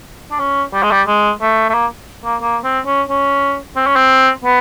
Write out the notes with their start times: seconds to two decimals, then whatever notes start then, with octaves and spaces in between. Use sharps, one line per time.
0.31 D4
0.39 C#4
0.73 G3
0.83 G#3
0.91 G3
1.07 G#3
1.41 A3
1.69 A3
1.74 A#3
2.24 A#3
2.41 A#3
2.64 C4
2.86 C#4
3.09 C#4
3.76 C4
3.87 C#4
3.96 C4
4.44 B3